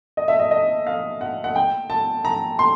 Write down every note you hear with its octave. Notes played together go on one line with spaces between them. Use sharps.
D#5
E5
D#5
D#5
F5
F#5
F#5
G5
A5
A#5
C6